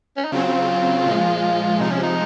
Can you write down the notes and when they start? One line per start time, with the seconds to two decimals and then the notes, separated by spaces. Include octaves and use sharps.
0.17 C#4
0.25 D#4
0.32 C#3 F#3 C4 F4
1.06 A#2 F3 G#3
1.80 C3 F3 G#3 D#4
1.92 C#4
2.03 D#4